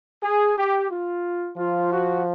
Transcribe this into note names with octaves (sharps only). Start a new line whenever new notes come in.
G#4
G4
F4
F3 F4
F#4